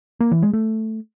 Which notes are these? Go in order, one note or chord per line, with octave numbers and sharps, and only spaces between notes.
A#3
E3
G#3
A3